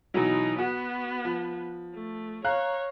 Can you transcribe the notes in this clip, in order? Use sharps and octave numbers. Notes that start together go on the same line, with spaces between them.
B2 E3 F#3 D#4
B3 F#4
F3
A3
C#5 F5 A#5 F#6